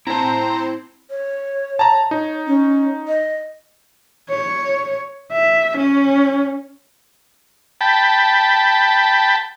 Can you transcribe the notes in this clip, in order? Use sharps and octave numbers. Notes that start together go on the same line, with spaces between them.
C4 E4 C5 A5 A#5
C#5
A5 A#5
D#4 C#5
C#4
D#5
C#5
E5
C#4
G5 A5 B5